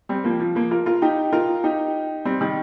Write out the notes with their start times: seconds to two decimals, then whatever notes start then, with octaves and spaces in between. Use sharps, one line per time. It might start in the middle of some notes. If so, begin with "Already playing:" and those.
0.09 G3 C4
0.24 F3 A#3
0.40 F3
0.55 F3 A#3
0.71 F4 A#4
0.86 F4 A#4
1.02 D#4 G4
1.33 F4 A#4
1.64 D#4 G4
2.25 G3 C4
2.41 D#3 G3